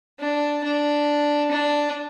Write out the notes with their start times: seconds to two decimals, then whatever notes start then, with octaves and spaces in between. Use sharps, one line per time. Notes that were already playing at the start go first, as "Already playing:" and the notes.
0.20 D4
0.64 D4
1.51 D4